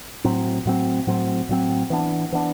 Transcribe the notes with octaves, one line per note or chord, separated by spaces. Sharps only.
A2 F#3 C4
A2 F#3 C4
A2 F#3 C4
A2 F#3 C4
E3 B3 D4
E3 B3 D4